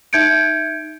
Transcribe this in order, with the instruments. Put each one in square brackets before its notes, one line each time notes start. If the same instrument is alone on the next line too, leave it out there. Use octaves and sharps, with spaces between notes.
[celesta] D#4 E5 G6 G#6 C#7 D7